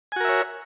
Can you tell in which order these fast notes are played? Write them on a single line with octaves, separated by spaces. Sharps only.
G#5 F#4 A#4 E5 C#5